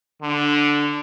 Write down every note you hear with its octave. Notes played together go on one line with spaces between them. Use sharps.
D3 D4